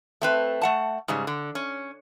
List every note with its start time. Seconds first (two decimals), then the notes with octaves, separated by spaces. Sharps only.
0.22 A3 C4 B4
0.62 A3 F#5 A5
1.08 G#2 C#3 G3
1.27 D3
1.55 C#4